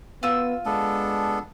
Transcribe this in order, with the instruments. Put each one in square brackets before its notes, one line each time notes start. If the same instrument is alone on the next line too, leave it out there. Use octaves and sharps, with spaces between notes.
[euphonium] B3 [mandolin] F4 E6
[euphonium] G#3 [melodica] B3 D4 A4